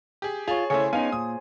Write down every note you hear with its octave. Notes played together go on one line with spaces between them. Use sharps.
G4 G#4
F4 G#4 C#5 A5
C#3 A3 E4 G#4 C5 C#5
B3 C#4 D#4 F5 G#5
A#2 D#6